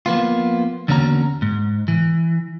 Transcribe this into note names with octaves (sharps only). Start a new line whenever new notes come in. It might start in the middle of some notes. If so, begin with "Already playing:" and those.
F3 A#3 B3 F4
E2 D3 A#3 C#4 F#4 A#5
G#2
E3